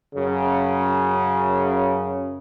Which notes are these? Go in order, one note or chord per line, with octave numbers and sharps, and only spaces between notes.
F#2 C#3